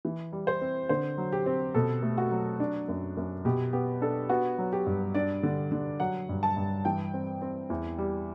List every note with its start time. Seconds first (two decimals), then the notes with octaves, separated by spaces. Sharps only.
0.05 E3
0.32 G3
0.47 C5
0.61 C4
0.89 D3 C5
1.18 F#3
1.32 G4
1.46 C4
1.75 B2 A4
2.03 A3
2.18 F#4
2.31 F#3
2.60 D4
2.88 F#2
3.17 F#2
3.45 B2 G4
3.73 B3 G4
4.01 D4 A4
4.29 B3 F#4
4.58 F#3
4.73 G4
4.86 G2
5.14 D4 D5
5.43 D3
5.72 D3
6.00 F#3 F#5
6.29 G2
6.43 A5
6.57 G2
6.85 E3 G5
7.14 C4
7.42 C4
7.70 E2
7.98 G3